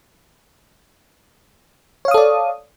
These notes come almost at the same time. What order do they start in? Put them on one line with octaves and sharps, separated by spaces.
C#5 F5 D#6 A4 D5